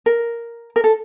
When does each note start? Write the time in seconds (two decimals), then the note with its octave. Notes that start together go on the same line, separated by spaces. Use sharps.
0.06 A#4
0.76 A#4
0.84 A4